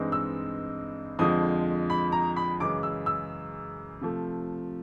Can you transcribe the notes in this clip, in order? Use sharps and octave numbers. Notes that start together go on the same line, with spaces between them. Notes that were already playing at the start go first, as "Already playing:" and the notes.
Already playing: G2 E3 G#3 C4 D#4
E6
F2 D3 F3 G#3 D#6
B5
A#5
B5
F#2 C#3 E3 G#3 D6
E6
E6
C3 F3 A3